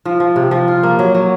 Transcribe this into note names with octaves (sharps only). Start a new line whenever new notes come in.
F3
F3
C3
F3
F4
A#3
F#3
F#3